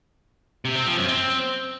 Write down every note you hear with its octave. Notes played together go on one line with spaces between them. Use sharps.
C3
C4
F3
F#2
C4